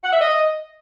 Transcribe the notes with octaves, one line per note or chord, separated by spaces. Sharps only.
F#5
E5
D#5